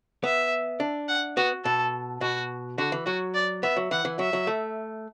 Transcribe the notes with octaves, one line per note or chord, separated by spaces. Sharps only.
B3 E5
D4
F#5
B3 F#4
B2 A4
B2 F#4
D3 F#4
E3
F#3 F#4
D5
B3 E5
F#3
E3 F#5
E3
F#3 E5
F#3
A3